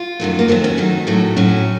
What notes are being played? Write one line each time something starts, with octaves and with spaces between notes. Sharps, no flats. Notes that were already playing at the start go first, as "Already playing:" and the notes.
Already playing: F4
F#2 D#3 F#3 A3
A#3
D#2 D#3 F#3 A3 C4
C#4
F2 D#3 F#3 A3 D#4
A2 F#3 A3
A2 F#3 A3 C#4